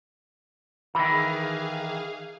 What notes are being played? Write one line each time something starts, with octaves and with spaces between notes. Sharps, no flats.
D#3 E3 G#4 F5 B5